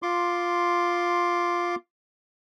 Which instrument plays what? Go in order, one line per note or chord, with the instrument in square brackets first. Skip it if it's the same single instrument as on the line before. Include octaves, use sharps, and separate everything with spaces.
[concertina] F4 C6 D6